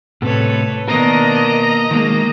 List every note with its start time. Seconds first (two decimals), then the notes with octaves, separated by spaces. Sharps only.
0.22 A2 C3 A4 B4 C#5
0.88 B2 D#3 A#3 D4 A#4 D#5 A#5
1.91 D#3 G#3 A#3